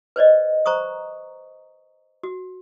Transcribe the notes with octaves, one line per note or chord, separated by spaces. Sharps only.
B4 C5 D5 D#5
C5 A#5 C#6 D#6
F#4